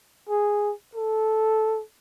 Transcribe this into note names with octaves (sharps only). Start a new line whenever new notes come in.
G#4
A4